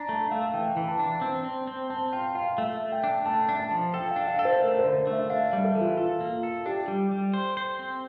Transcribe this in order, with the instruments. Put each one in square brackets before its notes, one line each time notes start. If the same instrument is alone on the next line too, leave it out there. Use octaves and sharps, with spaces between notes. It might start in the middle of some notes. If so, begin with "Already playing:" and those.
Already playing: [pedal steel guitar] D4 [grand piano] A#5
[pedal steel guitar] A3 [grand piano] A5
[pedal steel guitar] A3 [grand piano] F5
[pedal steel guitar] E3 [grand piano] G5
[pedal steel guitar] E3
[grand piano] A5
[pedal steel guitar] D4
C4
C4
C4
[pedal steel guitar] C4 [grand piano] A5
[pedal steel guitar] F4 [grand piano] G5
[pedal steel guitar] F4 [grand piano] F5
[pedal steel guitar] A3 [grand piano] E5
[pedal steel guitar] A3
[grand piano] G5
[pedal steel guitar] D4
[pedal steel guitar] A3 [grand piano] A5
[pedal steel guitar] D4
[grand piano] A5
[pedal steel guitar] F3
[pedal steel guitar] A4 [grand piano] G5
[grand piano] F5
[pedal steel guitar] D4
[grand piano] F5
[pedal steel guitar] A4
[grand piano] C5
[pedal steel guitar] A3 [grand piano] A#4
[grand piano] C5
[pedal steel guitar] D3
A3
[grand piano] E5
[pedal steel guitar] D4 [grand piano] F5
[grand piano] E5
[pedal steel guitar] G3
[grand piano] A4
[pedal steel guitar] E3
[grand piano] F4
[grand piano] F4 [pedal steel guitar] A4
[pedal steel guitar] A#3
A4
[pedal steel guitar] D4 [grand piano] G4
[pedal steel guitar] G3
G3
C5
C5
C4